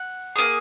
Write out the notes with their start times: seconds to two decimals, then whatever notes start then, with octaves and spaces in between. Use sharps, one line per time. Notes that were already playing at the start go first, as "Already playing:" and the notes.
Already playing: F#5
0.36 A#3 C#4 G#4